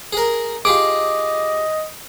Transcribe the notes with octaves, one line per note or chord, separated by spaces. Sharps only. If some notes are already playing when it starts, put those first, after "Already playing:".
G#4 A#4
F4 G4 G#4 D#5 D6